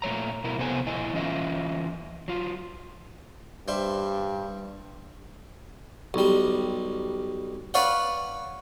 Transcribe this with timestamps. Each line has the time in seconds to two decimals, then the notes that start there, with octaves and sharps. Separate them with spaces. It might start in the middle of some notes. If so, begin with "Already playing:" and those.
0.02 A#2 A3 C#5 A#5
0.44 B2 E4 A#4
0.58 C3 B3 A4 C5 G#5
0.87 A#2 E4 D#5 G#5
1.13 E3 C#4 F4 D#5 E5
2.28 F#3 F4
3.68 G2 G3 C5 E5
6.14 B1 G3
7.74 B4 C#5 D5 F5 F#5